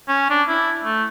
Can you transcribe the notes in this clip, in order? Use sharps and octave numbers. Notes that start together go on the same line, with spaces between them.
C#4
D4
E4
A3